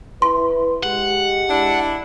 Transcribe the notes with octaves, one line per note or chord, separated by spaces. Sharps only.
E4 B4 C6
G#3 G4 F#5
D4 E4